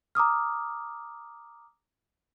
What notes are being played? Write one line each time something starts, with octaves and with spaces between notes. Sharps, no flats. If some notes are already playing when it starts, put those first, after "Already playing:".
A#5 D6 D#6 F6